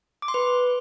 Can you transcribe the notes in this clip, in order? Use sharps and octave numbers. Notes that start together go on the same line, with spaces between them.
D6
C6
B4